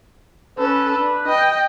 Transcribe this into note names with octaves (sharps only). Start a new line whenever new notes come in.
C#4 A4 B4
D4
D#5 G5